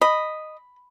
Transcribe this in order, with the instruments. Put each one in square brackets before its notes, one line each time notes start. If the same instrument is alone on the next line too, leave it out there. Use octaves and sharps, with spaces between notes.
[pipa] D#5 [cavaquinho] B5